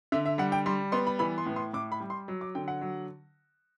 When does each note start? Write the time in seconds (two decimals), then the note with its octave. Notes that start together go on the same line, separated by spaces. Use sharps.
0.12 D3 E5
0.25 E5
0.38 G3 F#5
0.52 G5
0.66 G3 C6
0.92 B3 C6
1.07 B5
1.19 E3 B5
1.38 C6
1.46 A2
1.56 C6
1.73 A2 D6
1.92 B5
2.00 G3
2.10 C6
2.28 F#3
2.41 D6
2.55 D3 G5
2.68 F#5
2.81 F#3